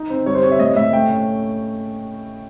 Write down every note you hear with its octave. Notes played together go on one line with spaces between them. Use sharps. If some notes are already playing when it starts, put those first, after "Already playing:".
Already playing: D#4
C4
G3 C#5
C5
C4 C#5
E5
A2 D#5
A2 E5
A3 G5
C#4